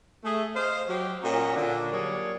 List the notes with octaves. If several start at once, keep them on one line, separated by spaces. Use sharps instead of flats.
A3 G#4
C5 D#5 F5
F#3 G4
A#2 C#4 F#4 C#5 D#5 A#5
A#2 D3 D4
F#3 G3 A#3 G#4 C#5 D5